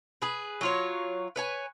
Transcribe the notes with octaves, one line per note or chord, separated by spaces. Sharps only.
G#4 B4
F#3 F4 C#5
B4 C#5 G#5